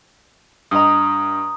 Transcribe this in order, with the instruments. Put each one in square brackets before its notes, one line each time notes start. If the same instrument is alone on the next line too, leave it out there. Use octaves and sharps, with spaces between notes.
[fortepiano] G2 D#5 [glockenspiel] A#5 D#6